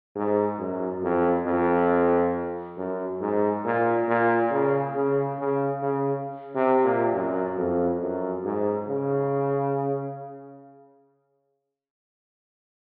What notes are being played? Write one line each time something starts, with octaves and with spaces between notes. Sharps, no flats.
G#2
F#2
F2
F2
F#2
G#2
A#2
A#2
C#3
C#3
C#3
C#3
C3
A#2
F#2
F2
F#2
G#2
C#3